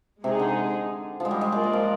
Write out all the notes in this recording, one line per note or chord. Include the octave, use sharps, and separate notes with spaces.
C3 G#3 D#4 G#4
D3
F3 G#3
G3
G#3
G#3 A#3 F4 A#4 D5
G#3
F3